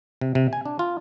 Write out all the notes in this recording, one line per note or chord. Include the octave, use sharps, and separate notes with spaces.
C3
C3
G#5
D4
F4